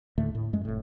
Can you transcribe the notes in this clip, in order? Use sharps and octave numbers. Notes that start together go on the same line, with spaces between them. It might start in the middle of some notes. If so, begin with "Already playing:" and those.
D#2 A2 D3 A3
A2
F#2 G#3 A3
F1 A2